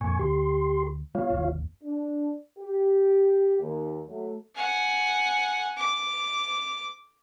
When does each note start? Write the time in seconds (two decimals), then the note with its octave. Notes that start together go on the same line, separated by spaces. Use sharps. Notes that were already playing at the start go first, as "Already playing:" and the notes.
0.01 F2 A#2 G#5 C#6
0.19 D2 G4 C6
1.15 G3 B3 F4 C#5 F5
1.30 G1 D#2
1.82 D4
2.58 G4
3.60 D#2
4.07 F#3 A3
4.56 F#5 G#5
5.77 D6